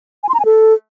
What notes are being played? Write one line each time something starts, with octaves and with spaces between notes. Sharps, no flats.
G#5
C6
A#5
G#5
A4